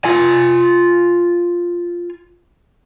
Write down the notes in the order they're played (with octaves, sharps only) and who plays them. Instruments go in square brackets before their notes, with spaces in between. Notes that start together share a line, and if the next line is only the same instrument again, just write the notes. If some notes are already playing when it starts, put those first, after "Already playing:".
[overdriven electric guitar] F4 G#5